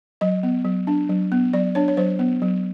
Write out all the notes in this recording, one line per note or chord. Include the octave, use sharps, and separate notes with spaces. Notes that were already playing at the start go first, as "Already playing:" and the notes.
F#3 D#5
B3
F#3
D4
F#3
B3
F#3 D5
D4 C#5
C#5
F#3 C5
B3
F#3